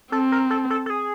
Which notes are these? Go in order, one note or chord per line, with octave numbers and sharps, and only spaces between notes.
C4 A4
A#4
A4
A4
A4
G#4